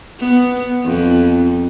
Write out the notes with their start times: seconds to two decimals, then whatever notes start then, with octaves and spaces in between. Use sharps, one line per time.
0.19 B3
0.85 F2